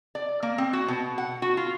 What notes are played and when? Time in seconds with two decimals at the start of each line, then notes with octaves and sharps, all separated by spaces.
0.15 D5
0.43 A#3
0.58 C4
0.73 F#4
0.88 B2
1.18 F#5
1.42 F#4
1.57 F4